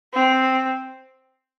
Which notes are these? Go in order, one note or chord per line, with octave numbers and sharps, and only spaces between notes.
C4